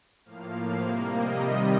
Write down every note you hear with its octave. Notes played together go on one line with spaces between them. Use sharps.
A2 F3 A#3 F5
C3 G3 A#3
D#5
C3 D#3 G3 D#5